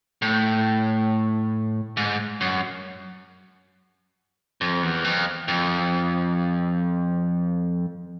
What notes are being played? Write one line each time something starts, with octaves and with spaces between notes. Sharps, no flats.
A2
G#2
F#2
F2
E2
F2
F2